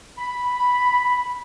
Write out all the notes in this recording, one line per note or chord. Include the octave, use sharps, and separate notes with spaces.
B5